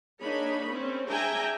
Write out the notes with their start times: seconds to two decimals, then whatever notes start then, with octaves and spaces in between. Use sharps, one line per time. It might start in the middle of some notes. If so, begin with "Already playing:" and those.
0.21 A#3 D4 D#4 G#4 C#5 B5
0.72 C4 C#4
1.09 D4 G#4 E5 G5 G#5 A#5